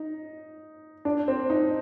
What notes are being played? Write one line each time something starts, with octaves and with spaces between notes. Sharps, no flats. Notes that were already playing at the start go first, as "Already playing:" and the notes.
Already playing: D#4
D4
C4
D#4